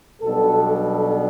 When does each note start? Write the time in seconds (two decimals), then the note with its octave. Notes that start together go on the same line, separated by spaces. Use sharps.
0.22 B1 B2 G3 D4 A4